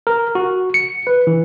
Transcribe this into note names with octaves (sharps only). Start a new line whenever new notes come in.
A#4
F#4
C#7
B4
E3